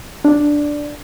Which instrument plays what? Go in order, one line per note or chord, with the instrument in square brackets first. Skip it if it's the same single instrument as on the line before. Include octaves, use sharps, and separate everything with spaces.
[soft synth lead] D4